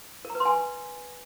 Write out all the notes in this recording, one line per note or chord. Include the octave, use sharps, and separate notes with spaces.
A#4
A#5
B4
C6
G#5